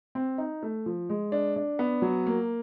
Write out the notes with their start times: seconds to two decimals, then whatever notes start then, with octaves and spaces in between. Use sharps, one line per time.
0.15 C4
0.38 D#4
0.63 A3
0.86 F3
1.09 G#3
1.32 D4
1.56 D4
1.79 B3
2.02 F#3
2.27 A#3